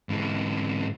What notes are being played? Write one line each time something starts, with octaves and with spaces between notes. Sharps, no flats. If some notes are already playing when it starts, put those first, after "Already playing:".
G#2 E3